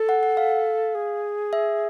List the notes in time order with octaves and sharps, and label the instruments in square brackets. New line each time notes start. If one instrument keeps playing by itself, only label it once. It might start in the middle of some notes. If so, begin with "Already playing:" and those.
Already playing: [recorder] A4
[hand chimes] F#5
F#5
F5
[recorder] G#4
[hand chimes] E5